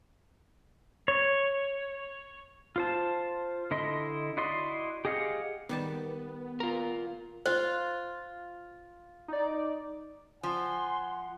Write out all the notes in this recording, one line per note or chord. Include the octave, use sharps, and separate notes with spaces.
C#5
F4 C5 A5
D3 E4 D#5 C6
E4 F#4 D5 D#5 C6
G4 G#4 D#5 F5 F#5
D#3 G3 B3 A5
F4 A#4
F4 C5
D#4 D5
F3 F#5 G#5 C6